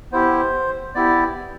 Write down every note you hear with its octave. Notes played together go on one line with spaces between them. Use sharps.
B3 E4 G4 C5
B3 E4 G4 D5